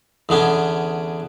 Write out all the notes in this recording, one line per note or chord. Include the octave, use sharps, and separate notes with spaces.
E2 D3 B3 C#4